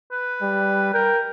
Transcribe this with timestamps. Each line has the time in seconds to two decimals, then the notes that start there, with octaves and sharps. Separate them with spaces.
0.12 B4
0.42 G3
0.94 A#4 G5